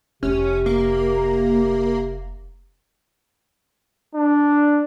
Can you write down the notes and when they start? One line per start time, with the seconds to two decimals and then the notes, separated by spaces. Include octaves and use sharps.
0.23 F1 C3 C#4 F4
0.66 A#3
4.15 D4